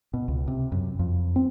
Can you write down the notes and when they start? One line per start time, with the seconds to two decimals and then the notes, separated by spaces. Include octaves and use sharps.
0.14 B2
0.28 C#2
0.48 C3
0.72 F#2
0.99 F2
1.36 C4